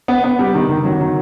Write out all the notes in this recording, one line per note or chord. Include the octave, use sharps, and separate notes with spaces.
B3
B3
G3
D#3
D#3
F#3
D#3